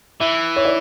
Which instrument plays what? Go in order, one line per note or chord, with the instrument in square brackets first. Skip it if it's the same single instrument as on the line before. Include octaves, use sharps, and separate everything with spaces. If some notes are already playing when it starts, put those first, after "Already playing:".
[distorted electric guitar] E3 [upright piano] E5
[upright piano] C#5
D5